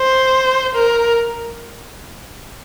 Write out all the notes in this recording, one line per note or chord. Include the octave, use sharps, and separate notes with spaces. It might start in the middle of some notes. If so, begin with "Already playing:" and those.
Already playing: C5
A#4